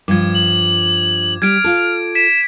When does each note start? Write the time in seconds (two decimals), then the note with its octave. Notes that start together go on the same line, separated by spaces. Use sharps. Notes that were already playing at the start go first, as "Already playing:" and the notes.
0.08 G2 F3 D6 G#6
0.35 F#7
1.42 G3 G4 F6 G#6 D7
1.64 F4 A4
2.15 B6 E7